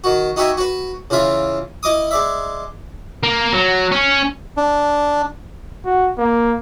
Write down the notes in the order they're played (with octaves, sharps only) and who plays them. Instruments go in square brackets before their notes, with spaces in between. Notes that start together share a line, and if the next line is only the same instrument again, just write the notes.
[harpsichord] D#3 F#4
D#4 F#4 G4 E5 G#5
F#4 B4
C#3 E3 F4 E5
E4 D#5 D6 D#6
G#3 D5 E5
[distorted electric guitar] A#3
F#3
C#4
[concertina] D4
[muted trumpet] F#4
A#3